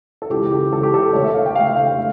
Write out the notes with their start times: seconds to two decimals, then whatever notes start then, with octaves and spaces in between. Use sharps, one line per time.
0.22 A4
0.30 C#2 C#3 E3 G4
0.52 G4
0.72 C#2 C#3 E3 A4
0.83 G4
0.94 A4
1.13 D2 D3 A3 C#5
1.24 E5
1.34 F5
1.46 G5
1.55 D2 D3 A3 F5
1.66 E5
1.76 F5
1.97 A3